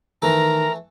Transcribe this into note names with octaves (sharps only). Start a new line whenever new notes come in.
D#3 E3 A3 A4 A#4 A#5